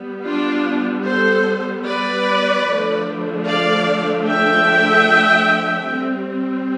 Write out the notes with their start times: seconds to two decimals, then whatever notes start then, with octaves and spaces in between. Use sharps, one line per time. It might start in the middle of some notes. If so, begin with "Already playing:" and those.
Already playing: G3 B3
0.25 D4 F4
1.05 A4 C5
1.86 B4 D5
2.66 D3 F3 A3 D4
3.46 D5 F5
4.26 E5 G5
5.87 G3 C4